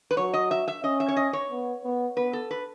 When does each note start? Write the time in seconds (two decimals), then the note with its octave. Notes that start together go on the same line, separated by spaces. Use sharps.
0.11 B4
0.17 F#3 C#5
0.34 D#5
0.51 E5
0.68 E5
0.84 C#4 D#5
1.00 E5
1.08 C#5
1.16 D#5
1.33 C#5
1.50 B3
1.84 B3
2.17 B3 B4
2.33 A4
2.51 B4